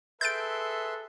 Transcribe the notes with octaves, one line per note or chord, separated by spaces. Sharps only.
G#4 A4 B4 E5 C6 G6 A6 D7